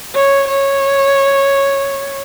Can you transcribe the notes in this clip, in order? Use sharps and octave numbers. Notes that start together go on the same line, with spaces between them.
C#5
C#5